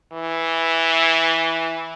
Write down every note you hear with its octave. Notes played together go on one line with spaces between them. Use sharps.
E3